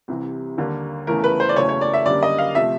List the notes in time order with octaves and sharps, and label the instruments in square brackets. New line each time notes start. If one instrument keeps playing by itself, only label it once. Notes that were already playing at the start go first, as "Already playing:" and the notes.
[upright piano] C2 C3 E3
D#2 D3 G3 A#3
E2 C#3 E3 A3 A#4
B4
C5
D5
F#1 E2 C#3 F#3 A3 C#5
C#5
D5
E5
F#2 D3 G3 A#3 D5
D#5
F5
C3 F3 A3 E5